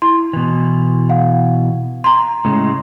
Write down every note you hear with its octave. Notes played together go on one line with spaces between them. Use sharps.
E4 C6
B2 E3
F5 F#5
A#5 C6
A2 C#3 G#3